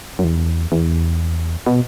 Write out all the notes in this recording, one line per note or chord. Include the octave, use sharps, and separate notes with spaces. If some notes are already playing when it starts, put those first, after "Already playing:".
F#2
E2
E2
B2